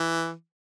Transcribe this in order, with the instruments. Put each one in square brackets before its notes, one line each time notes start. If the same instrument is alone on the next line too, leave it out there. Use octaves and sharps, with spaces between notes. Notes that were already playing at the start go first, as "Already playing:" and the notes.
Already playing: [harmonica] E3